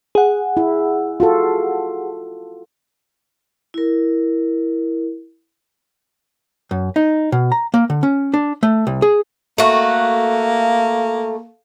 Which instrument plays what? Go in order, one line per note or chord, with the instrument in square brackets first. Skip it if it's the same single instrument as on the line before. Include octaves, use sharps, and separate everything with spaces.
[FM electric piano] G#4 F#5
[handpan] E4
F4 F#4 A4
[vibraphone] E4 A#4
[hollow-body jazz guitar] F#2
D#4
B2
A#5
A#3
D3
C#4
D4
A3
C2
G#4
[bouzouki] A3 F#4 [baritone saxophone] A#3 [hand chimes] A4 F5